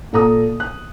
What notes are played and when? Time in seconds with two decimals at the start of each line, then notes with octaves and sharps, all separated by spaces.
0.13 A#2 A4 A#5 D#6
0.60 F#6